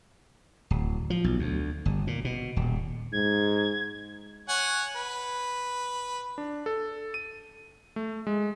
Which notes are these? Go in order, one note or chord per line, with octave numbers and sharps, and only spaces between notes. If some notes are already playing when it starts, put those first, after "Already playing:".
D1
F3
B1
D2
G1
A#2
B2
D#1
G#2 G#6
C#5 F#5 G#5
B4
D4
A4
D#7
A3
G#3